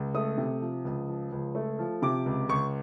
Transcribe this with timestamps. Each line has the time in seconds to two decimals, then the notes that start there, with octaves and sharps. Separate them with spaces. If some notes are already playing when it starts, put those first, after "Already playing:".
Already playing: C#2
0.14 A3 D#6
0.38 C3
0.61 F3
0.85 C#2
1.08 F3
1.32 C#2
1.55 A3
1.79 F3
2.02 C3 D6
2.26 C#2
2.49 C#2 C#6